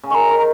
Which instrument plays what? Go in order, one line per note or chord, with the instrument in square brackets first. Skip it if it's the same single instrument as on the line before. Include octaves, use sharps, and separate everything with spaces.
[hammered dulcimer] C#3
[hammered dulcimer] D#3 [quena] C#6
[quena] A#5
[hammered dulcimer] D#3
[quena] A#5